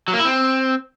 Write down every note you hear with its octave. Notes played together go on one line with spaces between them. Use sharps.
F#3
A#3
E4
C4